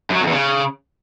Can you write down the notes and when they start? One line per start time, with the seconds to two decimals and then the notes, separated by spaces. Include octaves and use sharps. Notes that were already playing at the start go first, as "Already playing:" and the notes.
0.10 F#2
0.16 F#3
0.21 F2
0.27 E2
0.32 C#3